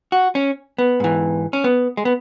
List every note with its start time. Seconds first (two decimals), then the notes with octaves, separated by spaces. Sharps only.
0.12 F#4
0.35 C#4
0.78 B3
1.00 G#2 E3
1.53 C#4
1.64 B3
1.97 G#3
2.05 B3